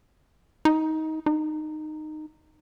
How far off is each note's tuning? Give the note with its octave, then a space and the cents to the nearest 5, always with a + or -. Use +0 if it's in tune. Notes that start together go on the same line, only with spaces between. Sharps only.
D#4 +20
D#4 -15